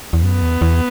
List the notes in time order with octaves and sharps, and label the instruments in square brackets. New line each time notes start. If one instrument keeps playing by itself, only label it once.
[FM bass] E2
[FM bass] F#2 [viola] B3
[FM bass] E2
E2